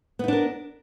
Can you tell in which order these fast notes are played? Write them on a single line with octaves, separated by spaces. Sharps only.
B3 D#4 D4 A#4